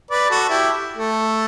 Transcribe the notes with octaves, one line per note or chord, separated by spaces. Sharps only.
B4 D5
F#4 A4
E4 G4
A3